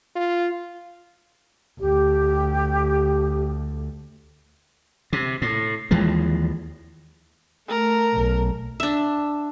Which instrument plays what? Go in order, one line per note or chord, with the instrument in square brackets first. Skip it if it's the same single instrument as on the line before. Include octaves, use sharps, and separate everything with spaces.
[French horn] F4
[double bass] D2 [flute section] G4
[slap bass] C3
A2
D#2 E3 F3 G#3
[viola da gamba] A3 [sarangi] A#4
[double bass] B1
[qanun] D4 E5